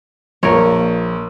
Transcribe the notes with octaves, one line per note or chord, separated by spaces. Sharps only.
A#1 A#2 A#4 C#5